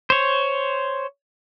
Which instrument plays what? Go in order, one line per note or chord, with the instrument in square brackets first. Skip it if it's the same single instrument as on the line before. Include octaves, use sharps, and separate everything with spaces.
[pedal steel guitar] C5 C#5